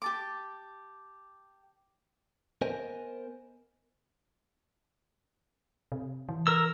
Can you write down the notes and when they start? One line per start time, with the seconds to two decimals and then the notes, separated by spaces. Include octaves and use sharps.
0.02 G4 A5 D6
2.61 B3 A#4 C5 D#5 G#5
5.92 C3
6.29 E3
6.47 A#4 E6